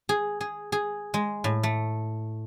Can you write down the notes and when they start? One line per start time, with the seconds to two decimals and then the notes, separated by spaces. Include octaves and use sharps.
0.09 G#4
0.41 G#4
0.72 G#4
1.14 G#3
1.44 A2
1.63 A3